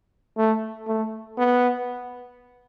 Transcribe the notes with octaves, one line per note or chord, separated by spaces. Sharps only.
A3
A3
B3